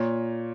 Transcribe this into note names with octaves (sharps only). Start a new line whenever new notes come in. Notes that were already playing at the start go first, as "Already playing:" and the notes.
Already playing: A#2 C#5